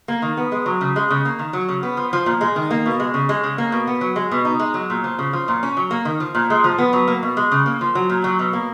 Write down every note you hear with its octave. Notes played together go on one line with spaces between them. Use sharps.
A#3
D#3
B3
G#3
F#3
C#3
G#3
C#3
A#3
D#3
F#3
C#3
B3
F3
F3
A#2
G#3
D#3
A#3
B2
G#3
C#3
G#3
C#3
A#3
B2
B3
F#3
G#3
B2
D#4
G#3
F#3
A#2
F3
C#3
F3
A#2
C#4
F#3
A#3
D#3
F3
A#2
G#3
F3
B3
F#3
A#3
B2
G#3
C#3
A#3
F3
F#3
A#2
F#3
B2
A#3